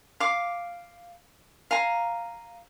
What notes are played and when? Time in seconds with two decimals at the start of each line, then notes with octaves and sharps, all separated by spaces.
0.20 F5 D6
1.71 F5 G#5 A#5